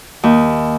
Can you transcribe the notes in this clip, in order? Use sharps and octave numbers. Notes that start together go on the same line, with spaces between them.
D#2